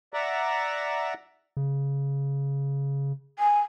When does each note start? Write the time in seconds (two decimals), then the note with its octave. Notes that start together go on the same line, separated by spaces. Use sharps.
0.14 D5 E5 F#5 A#5
1.57 C#3
3.39 G#5